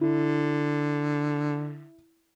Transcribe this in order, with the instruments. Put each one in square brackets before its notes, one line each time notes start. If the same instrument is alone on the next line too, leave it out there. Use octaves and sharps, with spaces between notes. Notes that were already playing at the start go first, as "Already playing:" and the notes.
[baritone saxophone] D3 [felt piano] E4